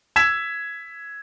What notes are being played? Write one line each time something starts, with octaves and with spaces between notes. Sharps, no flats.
E6 G#6 B6 E7